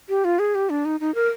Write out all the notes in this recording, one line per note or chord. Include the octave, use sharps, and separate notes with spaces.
G4
F4
G#4
G4
D4
D#4
D#4
A#4